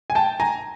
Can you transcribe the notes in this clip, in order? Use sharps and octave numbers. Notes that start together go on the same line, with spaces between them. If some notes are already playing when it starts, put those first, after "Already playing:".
G#5
G5 A5
G#5 A#5